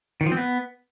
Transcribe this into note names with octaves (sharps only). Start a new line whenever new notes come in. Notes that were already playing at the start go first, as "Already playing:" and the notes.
D#3
F3
C4
B3